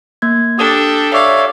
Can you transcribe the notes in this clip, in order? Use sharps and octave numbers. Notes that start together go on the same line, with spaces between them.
A#3 G#6
D4 G4 A4 D#6
C#5 D5 E5 F5